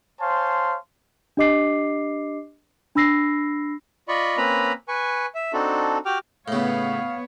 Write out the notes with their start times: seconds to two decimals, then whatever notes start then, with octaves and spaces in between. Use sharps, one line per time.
0.20 C5 C#5 F5 G#5 A5 C6
1.37 D4 G4 D#5 D6 C7
2.95 D4 B5 E6 A#6 C7
4.08 F4 D5 D#5 B5 C#6
4.37 A#3 C4 C#4 B4 A#5 B5
4.88 B4 G#5 C#6
5.35 E5
5.53 C4 D4 D#4 F#4 A4
6.06 F#4 G4 G5 D6 F6
6.48 A2 C#3 B3 C#5 F5